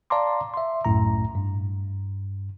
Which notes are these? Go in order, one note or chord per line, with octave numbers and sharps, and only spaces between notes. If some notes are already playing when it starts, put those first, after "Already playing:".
D5 F5 A5 A#5 C6 D6
E5 C6
C2 F#2 A2 A#5
G2